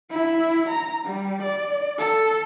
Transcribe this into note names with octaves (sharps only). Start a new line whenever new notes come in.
E4
A#5
G3
D5
A4